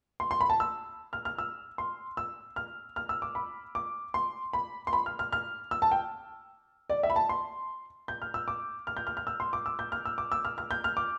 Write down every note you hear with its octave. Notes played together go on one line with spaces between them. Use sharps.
C6
C6
B5
A5
E6
F6
F6
E6
C6
E6
F6
F6
E6
D6
B5
D6
C6
B5
C6
B5
F6
F6
F6
E6
A5
G5
D5
E5
B5
A5
C6
G6
F6
E6
D6
F6
G6
F6
F6
E6
C6
D6
E6
G6
F6
E6
D6
E6
F6
F6
G6
F6
D6